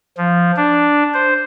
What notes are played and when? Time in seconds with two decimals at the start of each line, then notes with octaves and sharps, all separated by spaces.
0.18 F3
0.57 D4
1.14 C5